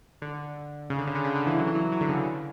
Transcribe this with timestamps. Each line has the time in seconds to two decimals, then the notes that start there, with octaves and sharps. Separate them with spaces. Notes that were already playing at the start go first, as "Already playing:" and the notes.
0.22 D3
0.90 C#3
0.98 D3
1.07 C#3
1.15 D3
1.24 C#3
1.35 D3
1.47 E3
1.58 F#3
1.67 E3
1.75 F#3
1.92 F#3
2.01 D3
2.09 C#3
2.18 D3